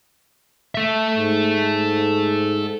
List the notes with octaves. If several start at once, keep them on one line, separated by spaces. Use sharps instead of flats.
A4 E5
G#2